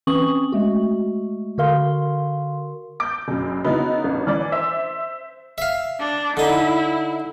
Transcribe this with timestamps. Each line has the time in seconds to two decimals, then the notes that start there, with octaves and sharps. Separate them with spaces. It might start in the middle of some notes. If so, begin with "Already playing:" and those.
0.07 E3 C4 C#4 C#6 D#6 F#7
0.52 G#3 A3 F#4
1.58 D3 F#4 A#4 F5 C6
3.00 D6 G6
3.28 F#1 F#2
3.64 C#3 B3 D#4 E4 F#4
4.04 A1
4.27 E3 D5
4.52 C5 E5 E6
5.58 E5 F5
5.99 D4
6.37 D3 D#4 E4